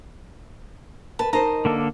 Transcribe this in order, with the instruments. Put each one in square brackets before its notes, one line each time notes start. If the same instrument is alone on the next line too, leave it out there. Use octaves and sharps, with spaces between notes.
[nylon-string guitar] A#4 B4 [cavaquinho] A5
[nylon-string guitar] D#4 A#4 C5 [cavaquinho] D#5 A5 A#5
[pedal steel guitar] D3 A#3 A4